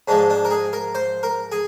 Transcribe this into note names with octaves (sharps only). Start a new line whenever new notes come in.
G#2 F3 G#3 D4
D4
A#4
G#4
A#4
C5
A#4
G#4